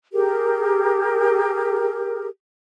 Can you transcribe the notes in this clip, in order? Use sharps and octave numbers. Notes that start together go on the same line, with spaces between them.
G4 G#4 A#4